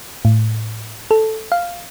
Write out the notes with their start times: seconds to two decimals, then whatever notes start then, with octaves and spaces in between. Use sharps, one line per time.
0.25 A2
1.11 A4
1.52 F5